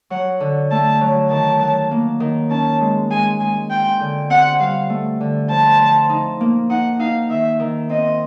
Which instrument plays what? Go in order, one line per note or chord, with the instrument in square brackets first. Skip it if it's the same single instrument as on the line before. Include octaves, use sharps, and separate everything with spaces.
[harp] F#3 [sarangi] F#5
[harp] D3
[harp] A3 [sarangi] A5
[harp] F#3
[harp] D#3 [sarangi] A5
[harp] F#3
A#3
D#3
[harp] C#4 [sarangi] A5
[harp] G#3
[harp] G#3 [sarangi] G#5
[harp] G#3 [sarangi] G#5
[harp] F4 [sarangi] G5
[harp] D3
[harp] C4 [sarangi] F#5
[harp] G3 [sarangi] F5
[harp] A3
D3
[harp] F3 [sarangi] A5
[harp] F3
D#4
A#3
[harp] D#4 [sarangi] F#5
[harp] D#4 [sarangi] F5
[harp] D#3 [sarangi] E5
[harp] D#3
[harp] C4 [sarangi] D#5